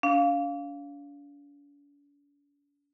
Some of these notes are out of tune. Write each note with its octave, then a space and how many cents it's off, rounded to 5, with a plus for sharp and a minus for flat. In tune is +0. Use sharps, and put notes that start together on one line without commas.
D4 -45 F5 +0